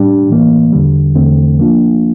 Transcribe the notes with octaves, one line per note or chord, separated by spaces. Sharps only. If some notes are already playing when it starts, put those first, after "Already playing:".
Already playing: A2 G3 D4 G4
A2 E3 A#3
E2 D3 G3
E2 D3 A3 C4
F3 A#3 D4 F4